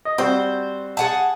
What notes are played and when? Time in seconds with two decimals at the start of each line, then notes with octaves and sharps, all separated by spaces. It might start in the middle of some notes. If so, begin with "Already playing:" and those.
0.05 D#5
0.18 G3 C4 F#4 C5
0.97 G#4 F#5 A5